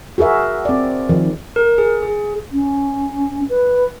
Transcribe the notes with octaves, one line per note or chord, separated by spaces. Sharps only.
F#4 G#4 A#4 E5
C4 D5
D#3 F3
A#4
G#4
G#4
C#4
B4